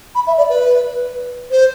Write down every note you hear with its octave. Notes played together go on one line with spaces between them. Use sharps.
B5
E5
D5
B4
C5